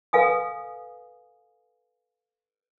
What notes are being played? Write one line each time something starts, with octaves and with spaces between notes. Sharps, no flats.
A4 B4 F5 G#5 D#6